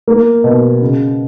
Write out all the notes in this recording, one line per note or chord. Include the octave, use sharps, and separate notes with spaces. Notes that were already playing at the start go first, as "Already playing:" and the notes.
A#3
B2
C#3